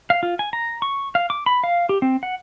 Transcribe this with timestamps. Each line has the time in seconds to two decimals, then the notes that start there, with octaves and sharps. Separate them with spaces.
0.10 F5
0.23 F4
0.39 G#5
0.53 A#5
0.82 C#6
1.15 F5
1.30 D6
1.46 B5
1.64 F5
1.89 G4
2.02 C4
2.23 F#5